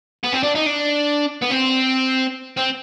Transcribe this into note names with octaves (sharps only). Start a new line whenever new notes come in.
B3
C4
D4
D#4
D4
B3
C4
C4